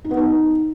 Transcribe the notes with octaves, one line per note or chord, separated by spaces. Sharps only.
D#4
B3
D#4